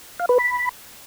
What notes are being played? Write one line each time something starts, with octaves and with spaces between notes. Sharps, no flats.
F5
B4
B5